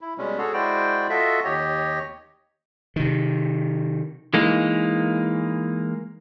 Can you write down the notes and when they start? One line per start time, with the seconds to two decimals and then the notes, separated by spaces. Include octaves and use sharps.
0.01 E4
0.18 B2 G3 G#3 C#4
0.38 F#4 G#4 A4 C#5
0.53 G#3 E4 F#4 C5 D5 G5
1.10 F4 F#4 A4 D#5 E5
1.45 D#2 G4 C#5 D#5
2.96 C3 D#3
4.34 E3 G#3 A#3 D#4